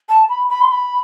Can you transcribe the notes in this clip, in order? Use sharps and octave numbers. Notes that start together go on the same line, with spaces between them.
A5
B5
B5
C6
B5